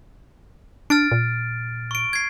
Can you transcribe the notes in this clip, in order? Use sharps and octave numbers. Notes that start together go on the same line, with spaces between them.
D4 F6 A6 D7
A#2
C#6 D7
G#6 C7